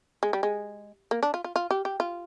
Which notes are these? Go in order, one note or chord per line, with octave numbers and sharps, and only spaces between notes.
G#3
G3
G#3
A#3
D4
F4
F4
F4
G4
G4
F4